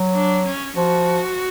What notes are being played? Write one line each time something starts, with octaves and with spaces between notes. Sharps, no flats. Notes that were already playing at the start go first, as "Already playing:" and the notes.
Already playing: F#3
D4
C#4
F3 F#4